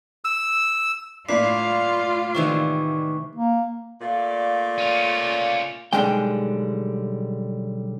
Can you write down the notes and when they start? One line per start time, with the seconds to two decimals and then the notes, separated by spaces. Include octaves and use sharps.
0.25 E6
1.29 A2 A#3 D4 F4 D6 B6 C7
2.35 C3 D#3 E3 C#6
3.35 A#3
4.01 A#2 A3 D5 F5
4.78 C#4 F4
5.93 B1 F#2 D3 G3 G#3 G5